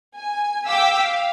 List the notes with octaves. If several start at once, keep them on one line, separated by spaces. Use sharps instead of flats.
G#5
F5 G5 D6 E6 B6
F5